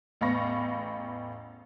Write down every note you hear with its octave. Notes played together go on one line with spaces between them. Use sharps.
A1 E2 F5 B5 C#6 A#6